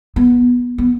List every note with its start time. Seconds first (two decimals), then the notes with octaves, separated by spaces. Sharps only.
0.16 B3
0.78 B3